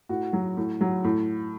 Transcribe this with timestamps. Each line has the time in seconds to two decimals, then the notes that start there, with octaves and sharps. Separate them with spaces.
0.09 A2 F#4
0.33 F#3
0.57 A2
0.81 F#3
1.04 A2